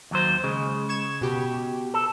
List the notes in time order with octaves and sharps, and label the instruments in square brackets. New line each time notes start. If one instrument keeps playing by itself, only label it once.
[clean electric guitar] D#2 F#3 C5
[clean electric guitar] C#3 [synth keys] G#3
[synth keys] C#6 G#6 E7
B2 G4
[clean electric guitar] A4